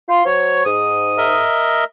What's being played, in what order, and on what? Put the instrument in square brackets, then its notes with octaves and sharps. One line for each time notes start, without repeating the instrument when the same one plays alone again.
[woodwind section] F4 C6
F#3 C5 C#5
G#2 D#6
[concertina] A#4 D#5 E5